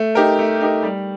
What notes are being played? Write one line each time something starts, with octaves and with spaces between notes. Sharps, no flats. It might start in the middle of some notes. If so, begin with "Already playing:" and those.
Already playing: A3
D#4 G4 A#4
A3
D#4 G4 A#4
G3